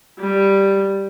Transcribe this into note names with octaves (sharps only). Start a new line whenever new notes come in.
G3